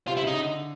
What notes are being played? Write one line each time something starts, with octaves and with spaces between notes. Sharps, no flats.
C3 F4
E4
C#3 D#4
D3